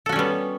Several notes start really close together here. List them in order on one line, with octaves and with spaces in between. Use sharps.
A4 F#4 C#4 G3 B3